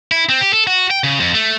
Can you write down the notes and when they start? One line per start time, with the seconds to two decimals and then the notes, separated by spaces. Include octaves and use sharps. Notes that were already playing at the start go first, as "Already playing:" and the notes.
0.12 E4
0.29 C4
0.41 G4
0.53 A4
0.67 F#4
0.91 G5
1.04 C#3
1.20 F2
1.34 A3